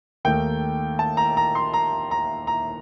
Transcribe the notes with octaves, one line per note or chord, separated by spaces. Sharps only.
D#2 D#3 A3 D#4 G5
A5
A#5
A#5
C6
A#5
A#5
A#5